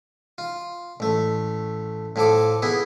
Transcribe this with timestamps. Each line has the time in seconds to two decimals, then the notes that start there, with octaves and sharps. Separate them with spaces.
0.38 F4
1.00 A1 A3
2.16 A2 F3 A4 D6
2.62 B3 E4 G#4